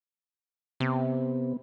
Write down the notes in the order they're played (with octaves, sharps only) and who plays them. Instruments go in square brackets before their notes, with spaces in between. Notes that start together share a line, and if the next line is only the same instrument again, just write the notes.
[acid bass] C3 [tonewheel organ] B3